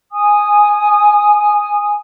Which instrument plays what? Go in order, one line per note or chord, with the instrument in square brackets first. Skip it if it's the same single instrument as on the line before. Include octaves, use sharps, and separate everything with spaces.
[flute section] G#5 D#6